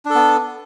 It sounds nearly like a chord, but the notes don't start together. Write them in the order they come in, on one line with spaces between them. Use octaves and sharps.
D4 A4 B3